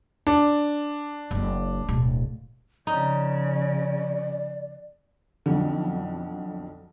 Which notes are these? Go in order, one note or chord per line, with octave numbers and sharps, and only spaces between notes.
D4
F#1 A#3
D1 B2
C#3 F3 D#4 D5
B1 F2 D3